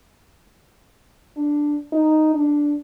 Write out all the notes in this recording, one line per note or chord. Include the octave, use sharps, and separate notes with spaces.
D4
D#4
D4